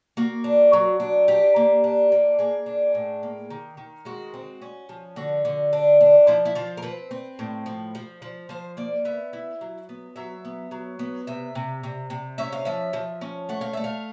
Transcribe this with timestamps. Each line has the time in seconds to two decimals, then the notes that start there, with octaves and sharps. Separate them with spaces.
0.17 A#3 F#4
0.44 D4
0.73 F#3
1.00 D4
1.28 D4 G4
1.56 A#3
1.84 D4
2.12 A#3
2.39 A#3 G#4
2.66 D4
2.95 A2
3.23 A#3
3.50 D#3
3.77 D#3
4.05 G#3 F#4
4.34 C4
4.62 C#4
4.89 F3
5.16 D3 F#4
5.45 D3
5.73 D4
6.00 D4
6.27 F3 E4
6.45 E4
6.55 F3 F4
6.77 A#4
6.82 C4 B4
7.11 C4
7.39 A2
7.66 F3
7.95 F3
8.22 F3
8.49 F3 C5
8.77 A#3 D5
9.05 B3 E5
9.33 E4
9.61 F#3
9.89 B3
10.16 F#3 E5
10.45 B3
10.71 F#3
10.99 B3
11.27 C3 E5
11.55 C3
11.83 C3
12.10 C3
12.38 C#4 E5
12.52 F5
12.65 F3 E5
12.93 F3
13.21 C#4
13.49 A3 F#5
13.61 F5
13.73 A3 E5
13.84 F5